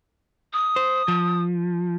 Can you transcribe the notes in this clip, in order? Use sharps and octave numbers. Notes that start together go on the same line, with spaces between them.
D#6
C5
F3